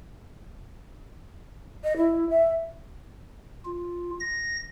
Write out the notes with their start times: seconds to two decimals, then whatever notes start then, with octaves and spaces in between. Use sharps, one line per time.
1.84 D#5
1.97 E4
2.30 E5
3.66 F4
4.20 A#6